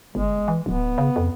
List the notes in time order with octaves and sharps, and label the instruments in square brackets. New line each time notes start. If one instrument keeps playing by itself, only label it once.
[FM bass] G1 [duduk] G#3
[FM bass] E3
[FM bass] D1 [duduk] B3
[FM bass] C#3
F2